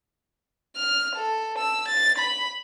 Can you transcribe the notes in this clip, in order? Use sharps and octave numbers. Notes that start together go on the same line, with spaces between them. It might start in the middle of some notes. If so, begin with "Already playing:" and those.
F6
A4
E6
A6
B5